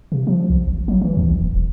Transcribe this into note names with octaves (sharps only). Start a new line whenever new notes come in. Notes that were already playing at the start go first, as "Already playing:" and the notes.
C3
F3
B1
G#1
F#3
E3
D#2
A1
D1
D#1